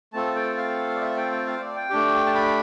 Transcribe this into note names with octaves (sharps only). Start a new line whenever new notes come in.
A3 C4 F4 A4 A5
G5
F5
D5
E5
G5
G5
F5
C5
D5
G5
A3 D4 G4
A5
B5